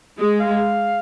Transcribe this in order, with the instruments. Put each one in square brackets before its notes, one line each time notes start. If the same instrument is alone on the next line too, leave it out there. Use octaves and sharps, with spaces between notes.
[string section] G#3 [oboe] D#5
[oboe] F5